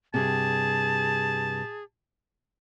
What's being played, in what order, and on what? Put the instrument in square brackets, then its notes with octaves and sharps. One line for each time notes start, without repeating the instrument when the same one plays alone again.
[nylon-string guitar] G2 C3 [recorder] G#4 [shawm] A5